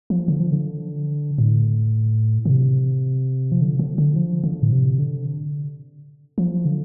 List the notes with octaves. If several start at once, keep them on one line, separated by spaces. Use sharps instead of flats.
F3
D3
F3
D3
A2
D3
C3
F3
D3
D3
D3
F3
D3
A2
C3
D3
F3
D3